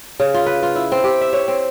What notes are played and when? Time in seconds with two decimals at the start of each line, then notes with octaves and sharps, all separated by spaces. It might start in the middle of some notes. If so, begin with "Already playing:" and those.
0.20 C#3
0.34 F4
0.46 B4
0.63 F4
0.76 E4
0.92 C4
1.04 G4
1.21 E5
1.33 C#5
1.48 C4